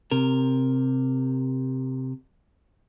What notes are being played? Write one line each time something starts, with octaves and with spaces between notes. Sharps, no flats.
C3 A#4